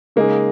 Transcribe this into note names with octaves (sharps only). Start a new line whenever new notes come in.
C#3 G#3 A#3 D#4 G#4